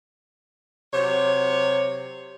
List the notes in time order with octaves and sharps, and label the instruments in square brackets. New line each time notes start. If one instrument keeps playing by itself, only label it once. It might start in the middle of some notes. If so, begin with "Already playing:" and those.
[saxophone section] C3 F#3 C#5